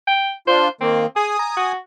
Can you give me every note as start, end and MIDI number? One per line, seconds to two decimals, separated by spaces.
0.07 0.32 79
0.47 0.69 62
0.47 0.69 65
0.47 0.68 72
0.81 1.06 51
0.81 1.06 58
0.81 1.05 60
1.16 1.36 68
1.16 1.72 80
1.16 1.72 87
1.39 1.53 82
1.57 1.77 66